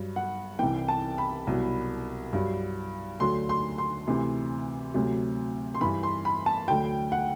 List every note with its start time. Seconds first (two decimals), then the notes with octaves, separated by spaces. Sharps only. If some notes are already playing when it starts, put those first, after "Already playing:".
Already playing: G2 F#3
0.16 F#5
0.59 C2 C3 E3 G5
0.88 A5
1.18 B5
1.47 C2 B2 F#3
2.33 G2 F#3
3.20 D2 D3 F#3 C6
3.49 C6
3.78 C6
4.07 D2 C3 E3
4.94 D2 C3 F#3
5.74 C6
5.81 G2 E3 B5
6.03 C6
6.25 B5
6.46 A5
6.68 D2 D3 F#3 G5
7.12 F#5